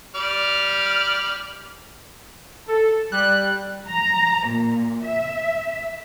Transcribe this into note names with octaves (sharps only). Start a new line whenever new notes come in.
G3 D5 F6
A4
G3 F#6
A#5
A#2
E5